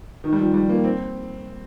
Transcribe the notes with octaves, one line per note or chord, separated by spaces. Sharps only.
D#3
G3
F3
G3
A#3
C4